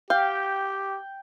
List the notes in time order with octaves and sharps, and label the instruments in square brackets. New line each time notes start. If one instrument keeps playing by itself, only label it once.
[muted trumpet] G4 [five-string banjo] F5 [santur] G5